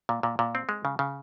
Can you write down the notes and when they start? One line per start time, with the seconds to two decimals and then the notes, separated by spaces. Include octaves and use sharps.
0.09 A#2
0.23 A#2
0.39 A#2
0.55 C4
0.69 G#3
0.85 C#3
0.99 C#3